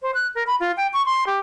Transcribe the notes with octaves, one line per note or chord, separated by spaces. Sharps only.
C5
F#6
A#4
B5
F4
G5
C#6
C6
G4